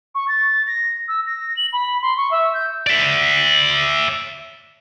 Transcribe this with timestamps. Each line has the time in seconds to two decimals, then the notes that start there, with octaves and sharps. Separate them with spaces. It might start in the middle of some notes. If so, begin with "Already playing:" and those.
0.15 C#6
0.28 A6
0.67 A#6
1.08 E6
1.26 A#6
1.57 F#7
1.73 B5
2.02 C6
2.17 C#6
2.31 E5
2.54 G6
2.87 D5 E5